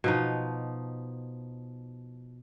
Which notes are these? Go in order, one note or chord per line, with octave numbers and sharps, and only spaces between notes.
B2 F3 D#4